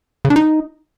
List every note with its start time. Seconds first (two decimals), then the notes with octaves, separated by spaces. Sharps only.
0.25 C#3
0.30 D4
0.36 D#4